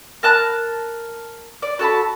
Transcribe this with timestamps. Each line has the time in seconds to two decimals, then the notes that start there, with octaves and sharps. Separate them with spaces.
0.23 A#4 A5 F#6
1.62 D5
1.79 F#4 A4 A5 B5